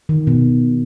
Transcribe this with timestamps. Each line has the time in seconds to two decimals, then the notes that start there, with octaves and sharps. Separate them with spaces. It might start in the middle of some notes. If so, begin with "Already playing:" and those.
0.09 D#3
0.27 B2